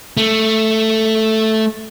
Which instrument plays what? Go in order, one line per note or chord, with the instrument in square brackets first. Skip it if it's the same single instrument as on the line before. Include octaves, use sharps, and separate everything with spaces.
[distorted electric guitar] A3